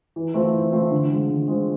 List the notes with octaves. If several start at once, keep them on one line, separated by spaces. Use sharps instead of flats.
E3
A3 C4 F4
E3
A3 C4 F4
D3
G#3 C4 F4
D3
G#3 C4 F4